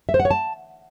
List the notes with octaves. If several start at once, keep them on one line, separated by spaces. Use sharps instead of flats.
E5
C5
F#5
C#5
A5